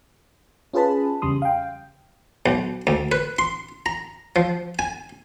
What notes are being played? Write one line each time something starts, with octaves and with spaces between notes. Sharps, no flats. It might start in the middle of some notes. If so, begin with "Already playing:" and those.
C#4 F4 G#4 B4 A5 B5
E2 C#3 G3 C6 D#6
F5 G5
B1
D2
B4
C6
A#5
F3
G#5